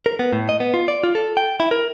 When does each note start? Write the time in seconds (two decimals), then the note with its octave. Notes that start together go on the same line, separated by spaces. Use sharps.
0.06 A#4
0.19 B3
0.33 A2
0.49 D#5
0.60 B3
0.74 F4
0.88 D5
1.03 F4
1.15 A4
1.37 G5
1.60 E4
1.71 A#4